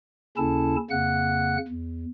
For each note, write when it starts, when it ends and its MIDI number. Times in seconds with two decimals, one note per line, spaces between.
0.37 0.76 39
0.37 0.76 49
0.37 0.76 61
0.37 0.76 64
0.37 0.76 69
0.37 0.76 81
0.90 1.57 41
0.90 1.57 49
0.90 1.57 58
0.90 1.57 78
0.90 1.57 90
1.68 2.05 40